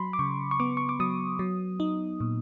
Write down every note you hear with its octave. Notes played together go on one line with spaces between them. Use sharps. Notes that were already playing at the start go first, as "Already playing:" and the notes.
Already playing: F#3 B5 C6
D6
C#3 C#6
C#6
B3 D6
C#6
D6
F#3 D#6
F#3
D#4
A#2